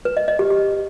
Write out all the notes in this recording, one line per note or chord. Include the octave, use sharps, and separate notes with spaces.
B4
D#5
D#5
G4
G4